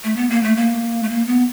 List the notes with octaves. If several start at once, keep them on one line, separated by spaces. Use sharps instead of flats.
A3
B3
A#3
A3
A#3
A3
A#3
B3